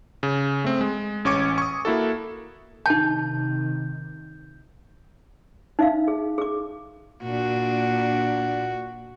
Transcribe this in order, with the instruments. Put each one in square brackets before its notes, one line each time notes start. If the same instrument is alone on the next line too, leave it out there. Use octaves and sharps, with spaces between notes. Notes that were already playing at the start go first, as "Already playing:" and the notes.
[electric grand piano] C#3
A3 C4
G#3
A1 C#4 C#6 D6 G#6 C#7
C#6 D#6
A#3 E4 F#4 A4
[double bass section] C3 D#3 [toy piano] D#4 A5 [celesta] G6
[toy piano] D#4 E5 F5
G#4
G#4 D6
[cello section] A#2 D4 [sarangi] F#4